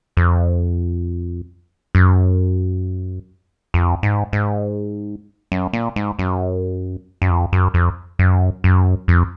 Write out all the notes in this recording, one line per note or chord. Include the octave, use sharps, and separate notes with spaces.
F2
F#2
F2
G#2
G#2
F#2
A#2
G#2
F#2
F#2
F2
F#2
F2
F#2
F#2
F2